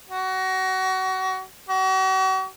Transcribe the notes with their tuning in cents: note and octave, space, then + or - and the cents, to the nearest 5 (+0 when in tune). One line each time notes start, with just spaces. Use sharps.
F#4 +25
F#4 +40